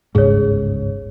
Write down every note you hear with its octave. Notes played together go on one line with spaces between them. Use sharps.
G1 C#2 G#2 G#4 C#5